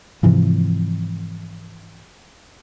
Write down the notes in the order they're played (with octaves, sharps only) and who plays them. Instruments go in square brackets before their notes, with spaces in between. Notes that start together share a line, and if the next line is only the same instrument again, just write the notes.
[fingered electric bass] G#2 C3 E3 F3